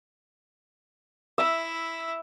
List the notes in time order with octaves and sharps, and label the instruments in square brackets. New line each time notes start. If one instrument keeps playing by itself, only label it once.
[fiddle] E4 [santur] E5